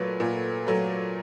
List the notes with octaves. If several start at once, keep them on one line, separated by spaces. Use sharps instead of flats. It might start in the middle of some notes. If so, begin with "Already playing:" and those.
Already playing: A#2 F#3 A3 B4
A#2
F#3 A3